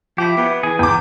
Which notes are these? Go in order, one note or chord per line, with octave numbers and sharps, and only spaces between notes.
F3 E4 G4
B3
E3 G#4
E2 G5 D6